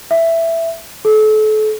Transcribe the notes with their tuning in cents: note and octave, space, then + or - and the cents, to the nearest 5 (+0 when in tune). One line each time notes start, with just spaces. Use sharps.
E5 +5
A4 -35